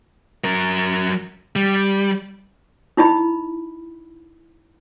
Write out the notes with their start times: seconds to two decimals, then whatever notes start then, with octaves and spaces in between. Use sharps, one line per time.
0.44 F#3 A#4
1.56 G3
2.97 D#4 E4 D#5 B5